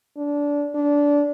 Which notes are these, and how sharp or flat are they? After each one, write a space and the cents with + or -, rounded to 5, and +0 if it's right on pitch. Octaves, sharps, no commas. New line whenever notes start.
D4 -20
D4 -20